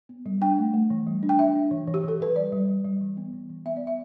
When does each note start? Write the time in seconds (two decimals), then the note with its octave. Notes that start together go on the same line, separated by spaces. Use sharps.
0.09 B3
0.26 G3
0.41 D4 G5
0.58 A3
0.74 A3
0.90 E3
1.07 G3
1.23 D4
1.29 G5
1.39 D4 E5
1.56 D4
1.71 E3
1.87 E3
1.94 G4
2.04 E3 A4
2.20 E3 B4
2.36 G3 D5
2.52 G3
2.68 G3
2.85 G3
3.01 E3
3.17 B3
3.33 E3
3.49 E3
3.66 B3 E5
3.77 D5
3.82 B3
3.87 E5